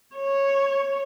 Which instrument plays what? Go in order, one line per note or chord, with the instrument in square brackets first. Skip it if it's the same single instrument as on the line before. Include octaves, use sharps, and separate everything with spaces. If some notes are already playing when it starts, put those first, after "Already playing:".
[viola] C#5